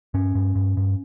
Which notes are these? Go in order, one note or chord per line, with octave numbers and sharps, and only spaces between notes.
G2 C#4
G2
G2
G2